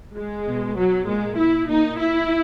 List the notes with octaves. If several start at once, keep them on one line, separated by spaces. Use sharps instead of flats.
G#3
B2
F#3
A#2 G#3
E4
A#2 D#4
E4